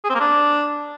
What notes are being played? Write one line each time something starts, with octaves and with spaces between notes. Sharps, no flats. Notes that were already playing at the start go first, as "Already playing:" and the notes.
G#4
C4
A#3
D4